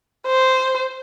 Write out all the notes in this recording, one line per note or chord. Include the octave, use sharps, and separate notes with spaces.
C5